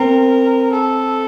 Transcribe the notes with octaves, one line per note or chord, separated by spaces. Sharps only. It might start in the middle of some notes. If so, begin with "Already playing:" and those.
Already playing: C4 A#4
A4